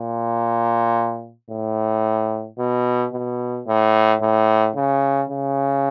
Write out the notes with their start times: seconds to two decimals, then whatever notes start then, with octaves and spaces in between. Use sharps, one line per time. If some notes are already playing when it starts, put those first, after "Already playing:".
Already playing: A#2
1.50 A2
2.58 B2
3.13 B2
3.67 A2
4.21 A2
4.76 C#3
5.30 C#3